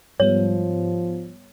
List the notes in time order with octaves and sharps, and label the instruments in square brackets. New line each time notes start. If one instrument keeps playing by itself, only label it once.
[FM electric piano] G#2 G3 B3 [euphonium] F3 [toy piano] C#5